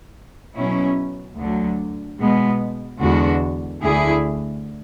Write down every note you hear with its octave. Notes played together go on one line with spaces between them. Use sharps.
B2 F#3 C#4 E4
D2 D3 F#3
B2 G#3 B3
E2 D3 G#3 D4 F#4
D2 D3 A3 E4 G#4